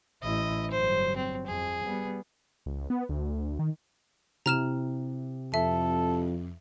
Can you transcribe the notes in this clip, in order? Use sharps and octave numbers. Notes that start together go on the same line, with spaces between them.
A1 E4 D#5
G1 F#3 C5
C4
F2 G#4
G3 B3
C#2
B3
D2
D#3
C3 E4 A#5 F6 E7
F2 A4 E5